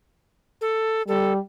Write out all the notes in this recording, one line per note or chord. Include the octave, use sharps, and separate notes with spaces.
A4
G3 A4